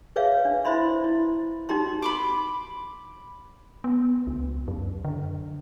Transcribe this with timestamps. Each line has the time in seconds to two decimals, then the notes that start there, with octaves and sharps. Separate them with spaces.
0.16 G#4 B4 C#5 E5 F5
0.45 D4
0.65 E4 C5 E5 B5 C6
1.04 E4
1.69 D#4 F#4 G4 A#5 C6
2.02 B5 C6 D6
3.84 B3
4.27 C#2
4.68 F#2
5.05 D3